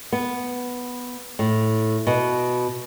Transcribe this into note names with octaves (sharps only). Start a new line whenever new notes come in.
B3
A2
B2